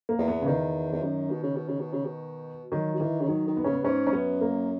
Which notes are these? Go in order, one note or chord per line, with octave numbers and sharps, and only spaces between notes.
A#3
E2
B3
C#3
E2 D#3
E2
F#2
B2
C#3
B2
C#3
B2
C#3
B2
D#3 F#3
F#3
D#3 E3
C#3
D#3 F#3
D#3
B3
C#3 C#4
B3
G#2 C#4
C#4
F#2 B3
A#3